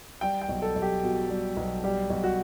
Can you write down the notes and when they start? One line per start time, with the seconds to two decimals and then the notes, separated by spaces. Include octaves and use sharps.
0.21 G3 G5
0.41 G5
0.49 B1
0.62 A4
0.76 B1
0.82 G4
1.03 B2
1.29 G3
1.57 B1
1.84 G3 G4
2.10 B1
2.24 F#4